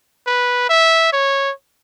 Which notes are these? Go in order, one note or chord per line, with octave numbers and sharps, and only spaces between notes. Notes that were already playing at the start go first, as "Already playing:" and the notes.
B4
E5
C#5